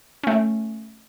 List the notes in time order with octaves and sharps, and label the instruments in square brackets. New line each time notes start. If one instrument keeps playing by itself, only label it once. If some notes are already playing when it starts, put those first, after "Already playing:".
[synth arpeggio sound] A3 C#4